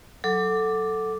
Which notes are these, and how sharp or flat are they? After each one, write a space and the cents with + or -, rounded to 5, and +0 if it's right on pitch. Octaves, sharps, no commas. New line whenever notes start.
F#3 +0 A4 +0 D6 +0